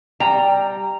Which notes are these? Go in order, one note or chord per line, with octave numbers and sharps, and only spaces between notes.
G3 G5 A#5